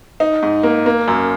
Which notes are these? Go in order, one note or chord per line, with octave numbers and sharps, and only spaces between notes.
D#4
G#2
A#3
A#3
F#2